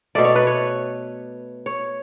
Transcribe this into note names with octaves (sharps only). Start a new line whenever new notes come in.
B2 A3 D5
C#5
B4
C#5
C#5